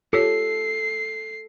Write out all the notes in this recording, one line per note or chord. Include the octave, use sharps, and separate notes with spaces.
F4 G4 A4 C#5 C7